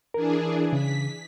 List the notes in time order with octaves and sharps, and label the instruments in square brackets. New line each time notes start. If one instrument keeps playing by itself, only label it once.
[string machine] E3 D4 G#4 [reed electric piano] A#4
[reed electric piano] C#3 [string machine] B6